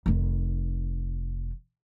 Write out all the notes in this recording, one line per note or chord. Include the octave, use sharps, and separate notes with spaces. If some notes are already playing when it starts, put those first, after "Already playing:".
F1 D#3